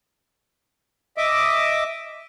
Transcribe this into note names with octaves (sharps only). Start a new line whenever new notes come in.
D#5 E5 D6